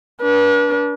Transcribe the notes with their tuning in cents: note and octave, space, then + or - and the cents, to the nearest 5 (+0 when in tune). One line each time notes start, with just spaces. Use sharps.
D4 -25 B4 -40